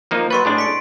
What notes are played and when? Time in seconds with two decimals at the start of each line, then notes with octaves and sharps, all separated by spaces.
0.11 F3 A#3 D#4
0.30 F#3 B4 C6 C#6 A6
0.45 A2 G#3 D4
0.58 B6 C#7 D7